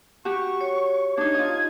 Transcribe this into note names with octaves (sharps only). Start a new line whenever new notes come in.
F#4 G4 C#6
C#5
D4 D#4 G#6
F4 D#5